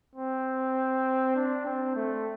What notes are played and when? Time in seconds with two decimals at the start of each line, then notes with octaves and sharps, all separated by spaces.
0.15 C4
1.36 D4
1.66 C4
1.96 A3